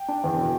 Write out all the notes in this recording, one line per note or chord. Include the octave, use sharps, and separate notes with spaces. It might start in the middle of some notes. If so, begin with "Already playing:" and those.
Already playing: G5
D4
E2
B2